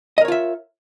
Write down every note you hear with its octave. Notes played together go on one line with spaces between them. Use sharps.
F4 A#4 C#5 D#5 E5